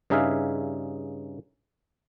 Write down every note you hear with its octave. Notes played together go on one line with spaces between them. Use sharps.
G2 C#3 D#4 G#4 E5 F5